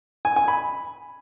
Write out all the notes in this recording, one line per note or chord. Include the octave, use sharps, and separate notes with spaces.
G#5
G#5
B5